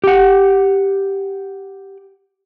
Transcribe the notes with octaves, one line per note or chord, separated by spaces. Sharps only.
G4 F#5